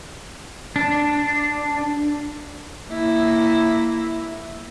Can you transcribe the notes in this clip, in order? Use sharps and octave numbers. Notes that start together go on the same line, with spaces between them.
D4
A#3 E4